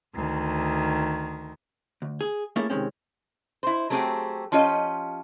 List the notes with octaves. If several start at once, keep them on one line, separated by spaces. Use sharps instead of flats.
D2 D#3
D2
G#4
A3 A#3 C#4 E4 G#4 A4
C3 D#3 G#3 C4 C#4
E4 C5
F#3 A3 C4 G4 G#4
F3 C#4 F4 G4 D#5